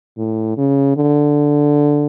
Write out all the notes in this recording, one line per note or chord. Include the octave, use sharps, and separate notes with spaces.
A2
C#3
D3